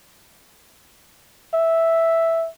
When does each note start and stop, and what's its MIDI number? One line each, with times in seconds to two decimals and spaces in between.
1.54 2.48 76